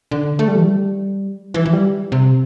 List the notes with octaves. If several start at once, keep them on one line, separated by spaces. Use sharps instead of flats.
D3
A3
G3
E3
G3
E3
E3
G3
C3